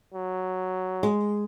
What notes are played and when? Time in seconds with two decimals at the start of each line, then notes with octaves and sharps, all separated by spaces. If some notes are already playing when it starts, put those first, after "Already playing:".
0.14 F#3
1.03 G#3